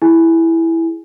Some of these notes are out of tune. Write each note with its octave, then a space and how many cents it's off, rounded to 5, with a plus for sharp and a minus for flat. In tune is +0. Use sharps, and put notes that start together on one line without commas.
E4 +0 G#4 -5 G#5 +0